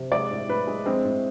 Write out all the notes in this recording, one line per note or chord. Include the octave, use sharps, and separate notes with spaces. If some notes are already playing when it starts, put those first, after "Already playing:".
Already playing: C3
G#3 D5
A2
A2 B4
G#3
G#3 C4
A2